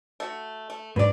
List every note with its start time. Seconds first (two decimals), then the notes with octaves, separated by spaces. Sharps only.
0.20 A3 F#4
0.70 A3
0.96 G#2 F#3 D4 B4 D5